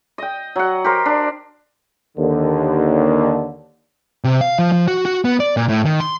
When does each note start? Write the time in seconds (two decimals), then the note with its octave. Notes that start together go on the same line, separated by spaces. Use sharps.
0.18 D#5 G5
0.56 F#3 F#5
0.84 G4 A#4 C5
1.06 D4
2.18 D#2 D3
4.24 C3
4.41 F5
4.59 F3
4.72 F3
4.88 F#4
5.05 F#4
5.25 B3
5.40 D5
5.57 A#2
5.69 A2
5.85 D#3
6.00 C6